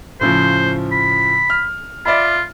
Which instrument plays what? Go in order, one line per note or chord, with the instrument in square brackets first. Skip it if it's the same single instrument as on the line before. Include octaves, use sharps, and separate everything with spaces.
[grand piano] A2 C#3 F3 [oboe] C5
[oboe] B5
[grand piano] F6
[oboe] F4 [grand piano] D5 E5 B5